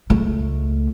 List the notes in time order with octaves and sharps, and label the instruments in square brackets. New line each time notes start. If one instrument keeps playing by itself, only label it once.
[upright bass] C#2 A3